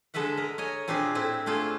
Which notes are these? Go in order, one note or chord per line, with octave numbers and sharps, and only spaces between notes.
D3 G#3 A4 B4 E5 F#5
A#4 D#5
C#5 D#5 G#5
A#2 C4 D4 F4 G4 G#4
A2 C4 E4
A3 D4 F4 G#4 A4